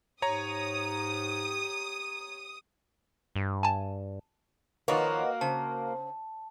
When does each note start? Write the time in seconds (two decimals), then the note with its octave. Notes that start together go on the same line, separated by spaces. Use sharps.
0.22 G#2 G4 C#5 A#5 D#6
3.36 G2
3.63 G#5 A5
4.88 D#3 F3 A#3 F#4 B4 C#5 D#5 F#5
5.41 C#3 C5 A5